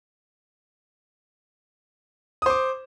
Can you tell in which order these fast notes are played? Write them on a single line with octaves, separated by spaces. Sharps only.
D#6 C5 D6